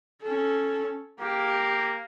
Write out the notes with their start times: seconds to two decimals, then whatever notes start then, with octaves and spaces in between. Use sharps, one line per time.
0.22 C#4 A4
1.20 A#3 G4